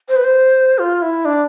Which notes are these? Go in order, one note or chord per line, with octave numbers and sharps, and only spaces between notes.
C5
B4
C5
F4
E4
D4